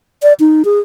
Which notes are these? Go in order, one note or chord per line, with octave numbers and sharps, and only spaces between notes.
D5
D#4
G#4